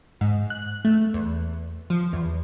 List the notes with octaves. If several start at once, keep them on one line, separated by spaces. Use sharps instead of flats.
G#2
F#6
A3
E2
F3
E2